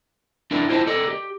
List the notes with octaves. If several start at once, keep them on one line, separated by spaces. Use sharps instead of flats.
D4 E4 A#4 D5
E4 F4 C5 C#5 D#5 A5
A4 A#4 D5 D#5
G4